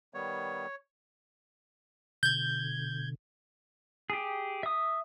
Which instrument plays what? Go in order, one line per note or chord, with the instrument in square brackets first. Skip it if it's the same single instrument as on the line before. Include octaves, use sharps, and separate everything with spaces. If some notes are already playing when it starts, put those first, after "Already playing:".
[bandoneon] D#3 G3 B3 [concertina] C#5
[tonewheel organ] B2 D3 [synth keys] G6 G#6
[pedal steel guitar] G4 G#4
E5 D#6